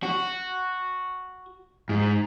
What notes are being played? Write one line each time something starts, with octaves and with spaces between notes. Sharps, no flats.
F#4
G#2